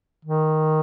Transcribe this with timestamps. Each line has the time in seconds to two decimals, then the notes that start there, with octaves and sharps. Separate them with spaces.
0.25 D#3